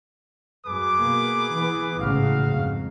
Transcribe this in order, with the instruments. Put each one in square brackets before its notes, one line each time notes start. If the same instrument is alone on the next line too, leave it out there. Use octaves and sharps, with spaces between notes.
[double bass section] F#2 [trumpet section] G#4 B4 D6
[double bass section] B2 A#3
E3 B3
[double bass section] A1 G#2 C#3 [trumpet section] F#4 F5
[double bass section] F2 G#2